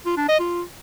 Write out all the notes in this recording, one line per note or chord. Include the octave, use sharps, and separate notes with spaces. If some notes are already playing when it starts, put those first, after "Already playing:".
F4
D4
D#5
F4